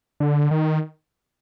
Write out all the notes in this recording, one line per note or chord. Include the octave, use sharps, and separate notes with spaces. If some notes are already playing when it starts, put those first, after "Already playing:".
D3
D#3